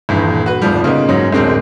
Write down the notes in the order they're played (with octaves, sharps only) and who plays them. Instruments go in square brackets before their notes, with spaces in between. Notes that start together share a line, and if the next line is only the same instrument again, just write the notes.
[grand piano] D#1 G2 E3
F#4 B4
D1 G#1 F2 F3 G3
A#2 C#3 A#3 B3 D#4
G#2 F#3 C#4
D1 G#3 C4 D4 A#4